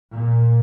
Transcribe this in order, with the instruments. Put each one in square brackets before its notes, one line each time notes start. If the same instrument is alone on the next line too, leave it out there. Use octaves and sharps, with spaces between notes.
[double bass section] A#2